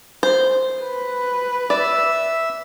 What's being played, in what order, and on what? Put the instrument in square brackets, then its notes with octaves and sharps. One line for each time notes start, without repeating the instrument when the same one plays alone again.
[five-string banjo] C5
[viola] B4
[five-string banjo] D5 [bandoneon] E5 E6